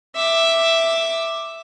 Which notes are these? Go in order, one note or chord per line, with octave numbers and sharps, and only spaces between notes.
E5 D6